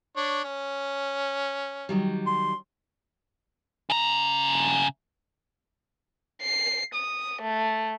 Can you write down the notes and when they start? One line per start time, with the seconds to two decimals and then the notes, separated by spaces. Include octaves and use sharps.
0.17 D4 C#5
0.44 C#4
1.89 D#3 F#3 G3
2.26 C6
3.90 C#3 A#5
6.42 C7
6.94 D#6
7.41 A3